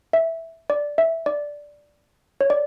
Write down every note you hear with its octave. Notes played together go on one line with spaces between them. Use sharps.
E5
D5
E5
D5
C#5
D5